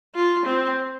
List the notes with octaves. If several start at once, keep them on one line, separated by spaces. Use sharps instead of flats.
F4
C4